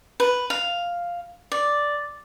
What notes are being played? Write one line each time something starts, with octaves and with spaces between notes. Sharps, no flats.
B4
F5
D5